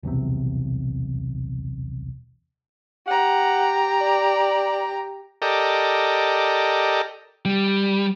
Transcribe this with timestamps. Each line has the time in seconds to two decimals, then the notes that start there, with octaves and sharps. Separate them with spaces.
0.03 D#1 B1 E2 C3
3.08 G4 F#5 A#5
4.01 D5
5.42 G4 A4 A#4 D5 D#5
7.45 G3